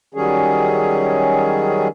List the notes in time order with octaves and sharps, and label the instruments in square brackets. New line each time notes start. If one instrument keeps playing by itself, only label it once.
[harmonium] D#3 F#3 G3 C#4 G#4